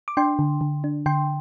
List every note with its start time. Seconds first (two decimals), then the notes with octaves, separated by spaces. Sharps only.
0.08 D6
0.17 D4 G5 C6
0.39 D3
0.61 D3
0.84 D4
1.06 D3 G5 C6